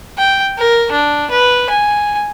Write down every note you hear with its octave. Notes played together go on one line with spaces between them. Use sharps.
G5
A#4
D4
B4
G#5